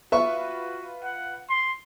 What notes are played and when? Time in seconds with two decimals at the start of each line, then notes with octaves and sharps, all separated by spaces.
0.12 F4 F#4 B4 E5 C#6
1.03 F#5
1.50 C6